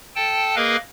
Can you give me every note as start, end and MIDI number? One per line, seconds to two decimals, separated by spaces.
0.16 0.55 69
0.16 0.55 79
0.16 0.55 81
0.56 0.77 58
0.56 0.77 68
0.56 0.77 70
0.56 0.77 71
0.56 0.77 75
0.56 0.77 77